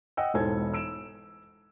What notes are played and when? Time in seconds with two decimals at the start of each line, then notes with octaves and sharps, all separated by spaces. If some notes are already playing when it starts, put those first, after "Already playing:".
0.17 D#5 F#5 G5 E6
0.34 E1 E2 G#2 A4 C5 G#6
0.73 E6 D7 E7